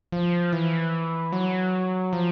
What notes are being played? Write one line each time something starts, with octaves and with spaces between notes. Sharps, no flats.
F3
E3
F#3
F3